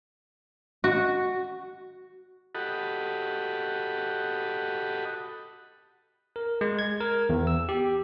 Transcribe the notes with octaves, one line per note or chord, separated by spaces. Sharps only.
F#4
F#4 G4 A4 D#5 F#5 B5
A#4
G#3
G#6
A#4
E2
E6
G4